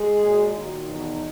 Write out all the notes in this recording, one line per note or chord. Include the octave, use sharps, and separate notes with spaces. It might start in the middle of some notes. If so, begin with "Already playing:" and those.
Already playing: G#3 G#4
A#2 F#3
A#2 D#3 F#3 D#4
E2 B2 F#3